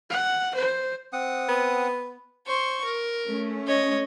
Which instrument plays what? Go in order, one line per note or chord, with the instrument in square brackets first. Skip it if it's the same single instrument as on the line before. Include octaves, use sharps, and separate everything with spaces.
[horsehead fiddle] F#5
C5
[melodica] C4 F#5 D#6
[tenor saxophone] B3
[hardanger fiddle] C5 C#6
A#4
[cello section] A3 C#4
[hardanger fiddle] C#5 D#5